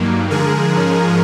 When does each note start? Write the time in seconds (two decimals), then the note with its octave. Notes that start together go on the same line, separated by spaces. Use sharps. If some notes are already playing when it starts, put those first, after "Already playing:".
Already playing: G2 D#3 F#3 A#3
0.31 D3 F3 G#3 G#4 A#4
0.73 G#2 F3 G#3 C#4